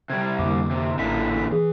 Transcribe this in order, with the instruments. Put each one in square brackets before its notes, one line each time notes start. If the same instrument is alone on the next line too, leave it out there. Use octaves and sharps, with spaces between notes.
[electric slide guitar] C3 G3 [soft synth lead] G#6
[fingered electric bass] F2 D3 A#3 [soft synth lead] D6
[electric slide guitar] C3
[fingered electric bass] A1 [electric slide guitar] A#2 D3 E3 [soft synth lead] B6
[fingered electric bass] E3 [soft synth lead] G#4